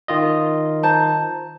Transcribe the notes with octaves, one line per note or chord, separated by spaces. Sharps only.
D#3 F4 D#5
C5 A5 A#5